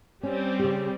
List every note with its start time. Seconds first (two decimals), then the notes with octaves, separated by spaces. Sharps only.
0.23 G3 C4 C#4
0.59 C#3 G4